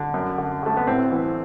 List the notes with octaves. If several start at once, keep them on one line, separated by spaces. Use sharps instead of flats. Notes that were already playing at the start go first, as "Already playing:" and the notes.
Already playing: D3
F#2
D3
D3 A3
B3
A2 C4
E3